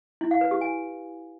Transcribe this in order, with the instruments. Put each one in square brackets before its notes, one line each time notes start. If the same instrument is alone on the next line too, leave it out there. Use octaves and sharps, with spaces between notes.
[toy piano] E4
F5
B4
G4
G#5